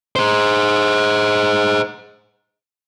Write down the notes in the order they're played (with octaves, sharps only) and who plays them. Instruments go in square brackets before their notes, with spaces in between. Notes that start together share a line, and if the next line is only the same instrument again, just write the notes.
[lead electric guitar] G#4 C5